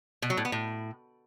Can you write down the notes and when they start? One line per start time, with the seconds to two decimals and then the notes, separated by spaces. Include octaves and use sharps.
0.22 B2
0.30 F#3
0.37 A2
0.45 B3
0.52 A2